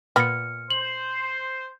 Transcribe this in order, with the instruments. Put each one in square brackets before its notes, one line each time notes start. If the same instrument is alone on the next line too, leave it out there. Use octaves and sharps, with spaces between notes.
[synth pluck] A#2 B5 A#6 [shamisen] B3 [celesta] F6 C#7
[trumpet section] C5 [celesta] F#7